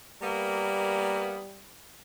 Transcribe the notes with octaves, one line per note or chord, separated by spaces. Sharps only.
G3 A#3 B3